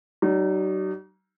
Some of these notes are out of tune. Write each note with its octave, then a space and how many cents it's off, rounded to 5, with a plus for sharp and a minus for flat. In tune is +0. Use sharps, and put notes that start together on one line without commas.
F#3 +45 D#4 -30